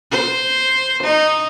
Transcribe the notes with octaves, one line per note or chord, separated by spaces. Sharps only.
C5
D#4